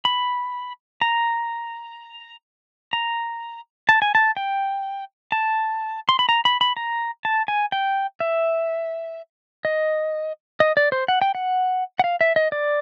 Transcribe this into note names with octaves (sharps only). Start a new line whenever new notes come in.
B5
A#5
A#5
A5
G#5
A5
G5
A5
C6
B5
A#5
B5
B5
A#5
A5
G#5
G5
E5
D#5
D#5
D5
C5
F#5
G5
F#5
F#5
F5
E5
D#5
D5